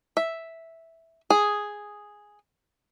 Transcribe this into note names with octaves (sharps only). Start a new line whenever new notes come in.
E5
G#4